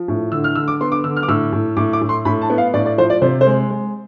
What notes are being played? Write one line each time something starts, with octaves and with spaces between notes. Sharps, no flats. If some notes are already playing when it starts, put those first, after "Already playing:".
Already playing: F3
A2
D3 E6
F6
D3 E6
D6
B3 C6
D6
D3 E6
F6
D6
A2 E6
A2
A2 D6
D6
A2
C6
A2 B5
A5
B3
F5
A2 D5
D5
F3 C5
D5
C3 C5
C5
G#3
G#3